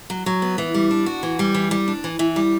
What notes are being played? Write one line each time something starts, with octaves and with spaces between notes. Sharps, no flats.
F#3
F#3
B3
E3
G3
D4
F#4
E3
G3
E3
G3
D4
E3
E3
G3